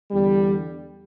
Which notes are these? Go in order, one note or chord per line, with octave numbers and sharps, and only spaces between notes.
E2 D3 G3